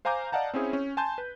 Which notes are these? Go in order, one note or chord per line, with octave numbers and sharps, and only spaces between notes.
C5 F5 G#5 A#5 D6 G6
D5 D#5 F5 F#5 A5 A#5
C4 C#4 E4 G#4 C#5
C#4
G#5 A5 C6 G6
B4